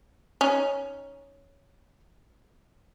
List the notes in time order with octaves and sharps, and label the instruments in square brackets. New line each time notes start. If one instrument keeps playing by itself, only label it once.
[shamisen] C#4 D#4